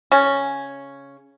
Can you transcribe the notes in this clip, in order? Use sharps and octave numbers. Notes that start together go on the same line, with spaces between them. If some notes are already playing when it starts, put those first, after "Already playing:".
C#3 C#4